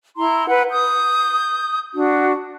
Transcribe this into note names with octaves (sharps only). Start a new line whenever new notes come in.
E4 A#5 C6
B4 F#5
D#6 G6
D4 F#4